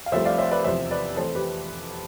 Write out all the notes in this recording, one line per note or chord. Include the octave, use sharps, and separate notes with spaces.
F5
C2 C3 F3 A3 C5 E5
D5 F5
C5 E5
B4 D5
F1 E2 C3 F3 C5 E5
B4 D5
F2 E3 A3 A4 C5
G4 B4